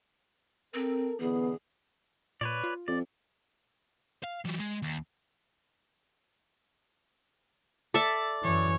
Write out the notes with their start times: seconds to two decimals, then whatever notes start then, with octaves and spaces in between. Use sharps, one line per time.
0.74 C4 A4 A#4
1.20 B1 D3 E3 B3 G#4
2.41 A#2 B4 C#5 D5
2.64 F4
2.88 F2 D5
4.24 F5
4.45 E3 F#3
4.59 G#3
4.82 D#2
7.94 A4 D5 E5
8.43 F#2 E3 C#5